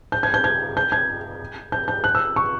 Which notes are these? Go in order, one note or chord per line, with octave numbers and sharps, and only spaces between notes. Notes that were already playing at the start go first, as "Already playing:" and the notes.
G6
G#6
G6
G#6
G6
G#6
G6
G6
F#6
E6
C#6